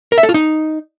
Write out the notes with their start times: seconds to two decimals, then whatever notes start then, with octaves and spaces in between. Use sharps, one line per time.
0.12 A#4
0.18 E5
0.23 A4
0.29 F4
0.34 D#4